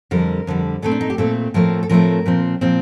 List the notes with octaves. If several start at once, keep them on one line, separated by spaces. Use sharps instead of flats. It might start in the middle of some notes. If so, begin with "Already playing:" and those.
F2 D3 G3 A#4
F2 D3 G3
A#2 A3 C4 A4
D4
D#4
G4
A#2 A3 C4 A4
A2 F3 A3 C4 A#4
A4
A2 F3 A3 C4 A#4
A#2 F3 C4
A#2 F3 C4